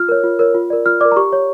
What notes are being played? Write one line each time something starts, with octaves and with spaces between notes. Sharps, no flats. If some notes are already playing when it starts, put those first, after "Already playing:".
Already playing: F4 F6
A#4 C#5
F4
A#4 C#5
F4
A#4 D5
F4 F6
A#4 D5 D6
A#5
G4 C#6
C#5